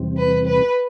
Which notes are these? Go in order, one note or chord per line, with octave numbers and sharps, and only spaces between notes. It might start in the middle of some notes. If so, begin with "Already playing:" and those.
Already playing: E2 C3 E3 G3 C4
B4
B4